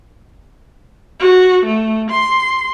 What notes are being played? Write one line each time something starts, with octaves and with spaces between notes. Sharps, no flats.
F#4
A3
C6